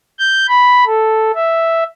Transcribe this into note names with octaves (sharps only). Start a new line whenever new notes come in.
G6
B5
A4
E5